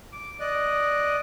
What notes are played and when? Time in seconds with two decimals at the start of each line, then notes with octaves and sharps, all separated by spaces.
0.12 D6
0.40 D5 D#5 F#6